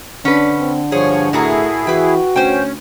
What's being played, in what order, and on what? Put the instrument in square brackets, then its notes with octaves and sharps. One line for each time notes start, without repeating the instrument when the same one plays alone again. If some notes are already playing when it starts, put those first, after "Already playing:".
[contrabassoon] D3 [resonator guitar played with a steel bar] C#4 B4 [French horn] D4
[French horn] C4
[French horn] G2 [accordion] F3 C#5 [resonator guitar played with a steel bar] G#4
[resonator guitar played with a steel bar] A2 F#4 A#4 [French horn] A3 [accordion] E4 G#4
[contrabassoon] E3 [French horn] F#4 [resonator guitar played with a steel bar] B4 G5
[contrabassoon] D2 [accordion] C#4 [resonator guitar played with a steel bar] C5 G5